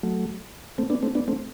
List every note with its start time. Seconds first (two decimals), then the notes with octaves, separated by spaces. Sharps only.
0.03 F#3 A3
0.78 A3 C4
0.90 B3 D4
1.03 A3 C4
1.15 B3 D4
1.28 A3 C4